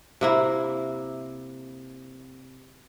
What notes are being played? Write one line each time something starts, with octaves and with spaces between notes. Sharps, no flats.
C3 A#3 E4